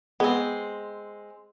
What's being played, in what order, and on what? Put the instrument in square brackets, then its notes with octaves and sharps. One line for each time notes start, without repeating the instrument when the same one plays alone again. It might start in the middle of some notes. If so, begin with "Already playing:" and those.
[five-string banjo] G#3 C4 [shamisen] B3 [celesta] G#4